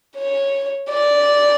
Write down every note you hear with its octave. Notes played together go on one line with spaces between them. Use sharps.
C#5
D5